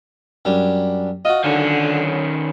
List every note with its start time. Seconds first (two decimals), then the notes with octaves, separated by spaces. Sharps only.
0.45 F#2 G3 D4
1.25 F4 F#4 D#5
1.44 D3 D#3 C#4